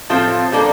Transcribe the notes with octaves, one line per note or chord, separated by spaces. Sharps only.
A2 F3 C4 F4 A4
G3 A#3 D4 A4